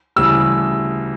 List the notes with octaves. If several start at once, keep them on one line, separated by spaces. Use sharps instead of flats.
D2 C#3 E3 G3 E6